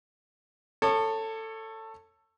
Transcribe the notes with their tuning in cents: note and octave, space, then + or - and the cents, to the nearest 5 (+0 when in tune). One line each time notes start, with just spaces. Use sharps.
A4 +15 C#5 -10 D#6 -45